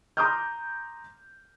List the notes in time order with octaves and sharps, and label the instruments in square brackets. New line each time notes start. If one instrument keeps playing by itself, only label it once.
[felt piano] A#5 C6 D6 D#6 F6 G6